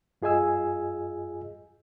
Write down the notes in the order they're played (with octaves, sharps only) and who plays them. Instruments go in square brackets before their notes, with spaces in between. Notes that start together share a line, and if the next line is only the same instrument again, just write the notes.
[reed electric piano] F#2 F4 G#4 D#5 G#5 E6